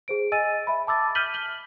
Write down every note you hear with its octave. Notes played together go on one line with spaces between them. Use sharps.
G#4 C5 D7
D#5 G#5 E6 A6 D#7
E5 B5
A5 D6 E6 A6
F6 G6 B6 D#7 F#7 G7
F#7 G7